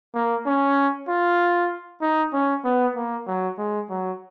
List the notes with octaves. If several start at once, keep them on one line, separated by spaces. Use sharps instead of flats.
A#3
C#4
F4
D#4
C#4
B3
A#3
F#3
G#3
F#3